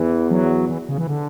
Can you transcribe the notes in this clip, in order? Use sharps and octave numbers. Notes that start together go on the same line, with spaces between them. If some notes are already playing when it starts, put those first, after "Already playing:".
Already playing: E2 E3
F#3
E3
C#3
E3
D3